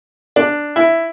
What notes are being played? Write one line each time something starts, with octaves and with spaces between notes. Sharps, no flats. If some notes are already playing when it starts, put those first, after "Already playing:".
D4
E4